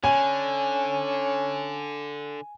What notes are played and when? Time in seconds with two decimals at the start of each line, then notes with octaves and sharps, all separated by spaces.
0.04 D3 C#4 G#5